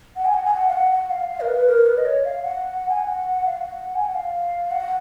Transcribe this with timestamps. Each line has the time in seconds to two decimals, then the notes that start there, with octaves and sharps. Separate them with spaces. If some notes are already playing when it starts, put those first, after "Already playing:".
0.16 F#5
0.25 G#5
0.34 F#5
0.45 G#5
0.54 F#5
0.68 F5
0.73 F#5
0.92 F#5
1.10 F5
1.30 F5
1.41 A#4
1.48 B4
1.67 A#4
1.86 B4
1.97 D#5
2.05 C#5
2.25 F5
2.43 F#5
2.89 G#5
3.00 F#5
3.46 F5
3.57 F#5
3.96 G#5
4.05 F#5
4.15 F5
4.71 F#5